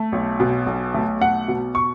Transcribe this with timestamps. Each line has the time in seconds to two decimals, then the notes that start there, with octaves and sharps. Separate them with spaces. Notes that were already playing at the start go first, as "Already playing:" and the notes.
Already playing: A3
0.12 B1
0.40 B2
0.66 B1
0.94 A3
1.21 B1 F#5
1.48 B2
1.75 C#6